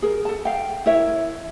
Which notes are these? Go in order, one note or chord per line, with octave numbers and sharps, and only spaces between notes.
G#4 A#4
A4 A5
F5 G5
E4 A#4 C#5 E5